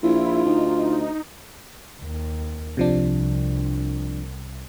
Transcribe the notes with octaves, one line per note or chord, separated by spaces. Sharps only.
A#1 E4 F4
D2 D#4
D#2
C2 C3 F3 D4